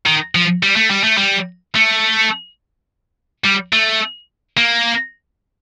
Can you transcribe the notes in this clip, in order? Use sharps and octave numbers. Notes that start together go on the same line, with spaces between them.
D#3
F3
G3
A3
G3
A3
G3
A3
G3
A3
A#3